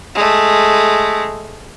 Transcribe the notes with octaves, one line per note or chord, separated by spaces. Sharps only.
G#3 A3